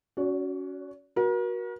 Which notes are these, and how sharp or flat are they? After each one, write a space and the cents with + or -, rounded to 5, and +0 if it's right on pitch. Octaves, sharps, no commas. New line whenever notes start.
C#4 +20 F#4 +0 D5 -40
F#4 -5 A#4 +40